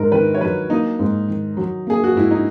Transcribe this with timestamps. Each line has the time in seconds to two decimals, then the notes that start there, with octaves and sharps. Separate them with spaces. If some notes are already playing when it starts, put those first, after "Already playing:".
Already playing: G#2 A#4
0.12 D#3 B4
0.34 C#5
0.41 F#3 B4
0.70 A#3 D#4
0.99 G#2
1.28 D#3
1.57 F#3
1.87 A#3 G#4
2.04 F#4
2.15 G#2 E4
2.31 D#4